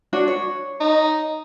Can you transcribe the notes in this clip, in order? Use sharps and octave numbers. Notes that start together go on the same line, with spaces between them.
D4 F#4 C#5
C#5
D#4